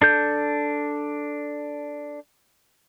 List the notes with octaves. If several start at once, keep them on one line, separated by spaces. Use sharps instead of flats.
D4 A4 G6